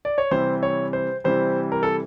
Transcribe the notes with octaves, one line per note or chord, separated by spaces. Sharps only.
D5
C#5
C3 E3 G3 C5
C#5
C5
C3 E3 G3 C5
A#4
A4